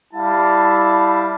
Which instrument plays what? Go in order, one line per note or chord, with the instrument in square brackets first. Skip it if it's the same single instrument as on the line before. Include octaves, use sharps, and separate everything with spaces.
[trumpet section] G3 E4 F5 A5